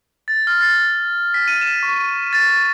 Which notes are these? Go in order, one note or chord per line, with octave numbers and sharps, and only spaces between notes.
A6
F6
A6
B6
D#7
E7
C#6
A6